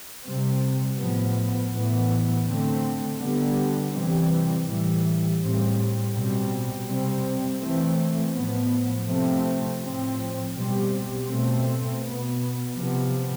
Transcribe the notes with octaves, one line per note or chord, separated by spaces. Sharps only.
C3 G3 C4
A2 F3 B3
A2 E3 B3
D3 A3 C4
D3 G3 B3
C3 E3 G3 C4
A2 E3 G3
A2 G3 C4
B2 G3 C4
C3 G3 C4
E3 A3 C4
A2 F3 B3
C3 F3 A3 C4
A2 F3 C4
B2 G3 C4
B2 A3 C4
B2 B3
C3 F3 B3